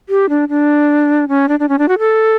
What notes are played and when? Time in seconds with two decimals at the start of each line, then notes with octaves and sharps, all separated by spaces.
0.09 G4
0.29 D4
0.49 D4
1.28 C#4
1.49 D4
1.60 D4
1.69 C#4
1.79 D4
1.88 F#4
1.99 A4